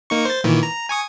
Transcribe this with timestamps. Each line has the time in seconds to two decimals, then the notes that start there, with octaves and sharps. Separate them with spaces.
0.10 A#3 D#4 C#6
0.25 C5 A6
0.44 A#2 D#3 E3
0.63 A#5
0.89 G#5 C#6 D#6